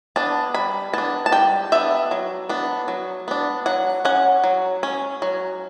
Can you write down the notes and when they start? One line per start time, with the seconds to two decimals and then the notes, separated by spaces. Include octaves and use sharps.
0.16 B3 D4 A5
0.54 G3 B5
0.93 B3 A5
0.98 D4
1.26 A5
1.32 G3 G5
1.72 B3 D4 E5
2.11 F#3
2.49 B3 D4
2.88 F#3
3.28 B3 D4
3.66 F#3 F#5
4.05 C#4 F#5
4.44 F#3
4.83 C#4
5.22 F#3